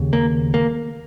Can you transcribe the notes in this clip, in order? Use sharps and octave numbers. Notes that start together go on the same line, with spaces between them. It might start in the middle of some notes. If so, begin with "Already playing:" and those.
Already playing: D#2 C#3
A#3
A#3